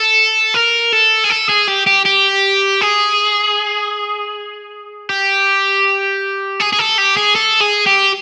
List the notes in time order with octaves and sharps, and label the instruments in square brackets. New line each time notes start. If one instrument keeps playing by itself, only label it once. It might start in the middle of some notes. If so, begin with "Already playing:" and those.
Already playing: [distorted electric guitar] A4
A#4
A4
G#4
A4
G#4
G4
G4
G4
G#4
G4
G#4
G#4
A4
G4
G#4
A4
G#4
G4